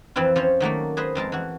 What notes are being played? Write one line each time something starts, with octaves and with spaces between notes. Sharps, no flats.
F2 E3 C4 E4 F4
F3 C#4 C5 C#5
D#3 F#3 A3 A#3
G#4 B4 C5 D#5
F2 G#3 A#4 A5
E3 F#4